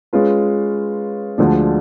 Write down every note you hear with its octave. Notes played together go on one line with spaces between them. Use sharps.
G#3 C#4 F4 B4
D2 D3 F3 G#3 D4